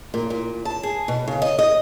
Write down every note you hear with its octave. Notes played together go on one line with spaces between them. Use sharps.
A#2
A#2
A5
G#4
B2
C#3
D#5
D#5